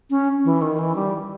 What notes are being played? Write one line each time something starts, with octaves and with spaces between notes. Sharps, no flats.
C#4
E3
D#3
E3
G3